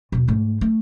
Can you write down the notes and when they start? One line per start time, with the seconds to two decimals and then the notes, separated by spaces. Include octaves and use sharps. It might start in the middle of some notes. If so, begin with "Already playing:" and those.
0.12 D#2 B2
0.28 G#2 A3
0.61 A3